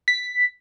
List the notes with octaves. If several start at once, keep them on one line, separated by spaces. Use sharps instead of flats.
B6